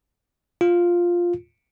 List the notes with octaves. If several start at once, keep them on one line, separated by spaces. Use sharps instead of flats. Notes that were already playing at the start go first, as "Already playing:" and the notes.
F4